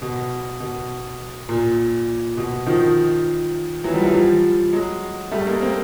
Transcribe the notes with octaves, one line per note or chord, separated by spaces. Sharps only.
B2
B2
A#2
B2
D#3 F3
E3 F#3
F3 G3
E3 F#3
F3 G3
F#3 G#3
G3 A3
G#3 A#3
A#3 C4